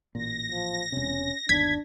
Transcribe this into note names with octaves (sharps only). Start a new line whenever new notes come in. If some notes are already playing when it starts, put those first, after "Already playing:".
A1 A#2 A#6
F3
E1 C3 C#4
G1 D#2 D4 G#6 B6